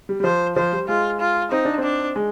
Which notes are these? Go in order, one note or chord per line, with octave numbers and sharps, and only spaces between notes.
G3
G3
F3 C5
F3 C5
G3
G#3 F4
F4
C4 D#4
D4
C4
D4
G#3